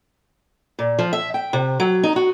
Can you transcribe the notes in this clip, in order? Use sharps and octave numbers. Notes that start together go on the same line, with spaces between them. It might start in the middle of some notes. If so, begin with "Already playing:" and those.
A#2
F3
E5
G5
C3
F#3
D#4
F#4